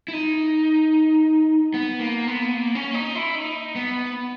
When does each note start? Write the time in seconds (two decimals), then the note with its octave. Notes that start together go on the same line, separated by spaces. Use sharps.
0.08 E4
0.13 D#4
1.74 B3
2.00 A#3
2.27 B3
2.54 A#3
2.75 C#4
2.94 D#4
3.15 E4
3.35 D#4
3.76 B3